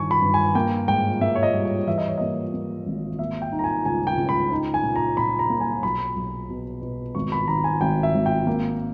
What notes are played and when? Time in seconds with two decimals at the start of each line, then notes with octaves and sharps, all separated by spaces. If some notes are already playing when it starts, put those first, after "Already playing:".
Already playing: G1 G2 D#3 G#5 C#6
0.11 B5
0.22 G2
0.34 G#5
0.55 A#3 G5
0.88 G#2 G5
1.21 A#3 E5
1.35 C#5
1.43 D#5
1.54 G3
1.65 C#5
1.87 E3 E5
1.98 D#5
2.08 C#5
2.18 A#3 D#5
2.54 A#3
2.86 G#1
3.19 A#3 E5
3.42 G5
3.52 D#4
3.59 A#5
3.64 G#5
3.85 C#2 G#5
4.07 G5
4.18 C#2
4.29 B5
4.52 D#4
4.74 G#5
4.84 A#2
4.96 A#5
5.17 A#2 B5
5.39 A#5
5.50 A#3
5.61 G#5
5.83 B1 B5
6.16 B1
6.49 B2
6.82 B2
7.15 G#1 C#6
7.32 B5
7.48 D#3 A#5
7.64 G#5
7.81 G#1 G5
8.03 E5
8.15 G#1
8.26 G5
8.47 A#3